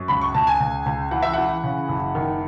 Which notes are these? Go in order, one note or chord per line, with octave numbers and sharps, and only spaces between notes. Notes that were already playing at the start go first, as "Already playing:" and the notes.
Already playing: F#2
C#2 B5
C#6
C#2 A5
G#5
C#2
C#2
E3 F#5
E5
E3 F#5
C#3
F#1
D#3